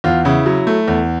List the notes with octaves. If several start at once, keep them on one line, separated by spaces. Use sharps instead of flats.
E2 F4
C#3 E4
F#3
A3
E2